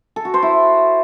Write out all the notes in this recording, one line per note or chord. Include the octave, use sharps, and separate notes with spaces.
A4
F#4
C5
E4